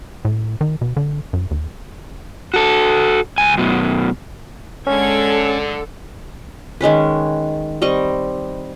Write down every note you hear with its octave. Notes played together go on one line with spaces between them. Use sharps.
A2
D#3
B2
D3
F#2
D#2
F#4 A4
C#2 G#5
F#2 B2
D3 G#3 C#4 A4 G#6
D#3 G#3 C#4 B4
G3 C4 D#5 C#6